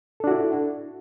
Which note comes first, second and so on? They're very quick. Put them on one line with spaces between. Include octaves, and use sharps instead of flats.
A4 D4 F#4 E4